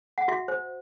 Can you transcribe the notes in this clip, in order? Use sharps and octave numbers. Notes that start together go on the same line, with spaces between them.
F#5
F#4 E5
C5